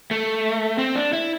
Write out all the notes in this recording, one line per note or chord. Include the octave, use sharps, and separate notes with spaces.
A3
C4
D4
E4